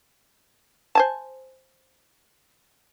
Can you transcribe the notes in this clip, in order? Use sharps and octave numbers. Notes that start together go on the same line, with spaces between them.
C5 G#5 A5